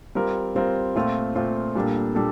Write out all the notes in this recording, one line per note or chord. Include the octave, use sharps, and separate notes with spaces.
G3 C4 F4 A#4
G3 C4 F4 A#4
A#2 A3 C4 F4
A#2 A3 C4 F4
A#2 G3 A#3 D4 A4
A#2 G3 D4 A4